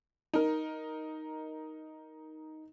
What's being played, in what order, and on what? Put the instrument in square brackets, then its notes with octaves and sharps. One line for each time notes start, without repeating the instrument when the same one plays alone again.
[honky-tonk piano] D#4 A#4